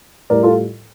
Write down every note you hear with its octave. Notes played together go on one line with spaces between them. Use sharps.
A2 G3 A#4 D5
F4 A4